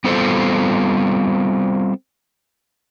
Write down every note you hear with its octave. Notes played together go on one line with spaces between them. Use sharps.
G3 B3 C4 F4 A4 C5